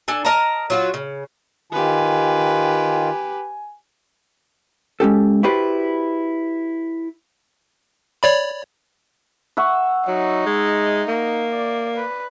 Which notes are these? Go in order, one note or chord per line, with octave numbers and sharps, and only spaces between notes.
D4 A4 G#5
A#4 D#5 A5 A#5
F#3 F4 F#4
C#3
D#3 F4 G4 B4 G#5
G#3 C#4 G4 A4
E4 F#4 G4 B4 C5 D5
C#5 D5 B5
E5 F#5 C#6
F#3 D#4
G#3
A#3
D5
B4